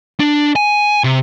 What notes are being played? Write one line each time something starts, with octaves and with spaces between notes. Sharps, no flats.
D4
G#5
C3